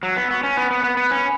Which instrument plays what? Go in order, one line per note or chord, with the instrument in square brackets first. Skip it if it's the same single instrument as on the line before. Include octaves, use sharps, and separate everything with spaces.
[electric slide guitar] F#3 [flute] E6
[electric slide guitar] B3
[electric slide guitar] B3 [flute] C#6
[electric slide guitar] C#4
[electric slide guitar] B3 [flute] B5
[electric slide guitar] B3
B3
B3
C#4